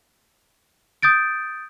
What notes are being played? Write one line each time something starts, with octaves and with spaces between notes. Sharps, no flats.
D#6 G6 A6 D7